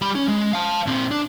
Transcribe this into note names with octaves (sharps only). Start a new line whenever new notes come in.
G3 B5
C#4
G#3
F5 A5
A#2 C4
D4